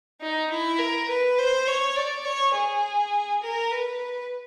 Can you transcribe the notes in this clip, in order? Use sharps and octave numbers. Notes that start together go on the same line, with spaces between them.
D#4
E4
A#4
B4
C5
C#5
D5
C#5
G#4
A#4
B4